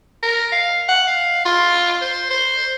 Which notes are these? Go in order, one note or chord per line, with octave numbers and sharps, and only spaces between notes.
A#4
F5
F#5
F5
F4
C5
C5